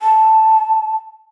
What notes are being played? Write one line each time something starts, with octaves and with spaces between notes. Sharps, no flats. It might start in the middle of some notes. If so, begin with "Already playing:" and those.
A5